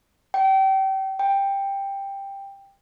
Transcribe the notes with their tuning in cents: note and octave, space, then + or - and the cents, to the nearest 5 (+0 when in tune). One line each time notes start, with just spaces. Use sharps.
G5 -30
G5 +10